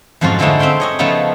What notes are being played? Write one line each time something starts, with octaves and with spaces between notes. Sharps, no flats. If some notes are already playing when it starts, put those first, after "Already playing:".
F2 G#2 F3 F#3 C#4 F4
G#2 D3 F3 A3 D#4 E4
C4 E5 F5 G5 C6
C#5 D#5 G#5
C#3 F3 A3 B3 D#4 F4